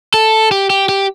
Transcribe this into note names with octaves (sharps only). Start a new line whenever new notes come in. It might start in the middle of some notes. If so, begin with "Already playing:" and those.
A4
G4
G4
G4